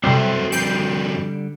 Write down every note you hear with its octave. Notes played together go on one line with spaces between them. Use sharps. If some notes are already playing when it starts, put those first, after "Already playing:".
C3 F#3 G3 C4 F#4 A4 C5 E5
D3 F3 G3 C4 F#4 G6 C7 D7